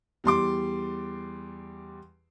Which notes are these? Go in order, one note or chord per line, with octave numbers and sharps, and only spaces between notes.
E2 G3 C6 D6